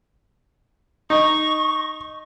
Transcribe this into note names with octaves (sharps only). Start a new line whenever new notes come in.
D#4 D#5 C#6